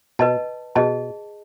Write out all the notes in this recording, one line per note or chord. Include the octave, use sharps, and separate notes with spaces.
B2 B4 D#5 A5
B2 G#4 D#5 A5